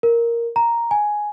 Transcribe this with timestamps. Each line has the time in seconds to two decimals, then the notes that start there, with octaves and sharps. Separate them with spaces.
0.03 A#4
0.56 A#5
0.91 G#5